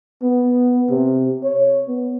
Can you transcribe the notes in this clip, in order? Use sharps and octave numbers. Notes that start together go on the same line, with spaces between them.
B3
C3
C#5
B3